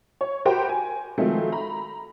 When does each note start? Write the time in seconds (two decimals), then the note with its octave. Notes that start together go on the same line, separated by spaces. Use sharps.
0.21 C#5
0.45 F#4 G4 A#4 C5 G5 B5
0.69 G#5
1.18 D#3 F3 F#3 G#3 A3 C4
1.52 A#5 B5